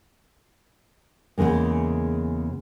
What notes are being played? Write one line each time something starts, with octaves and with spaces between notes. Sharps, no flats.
E2 C#3 G#3 A#3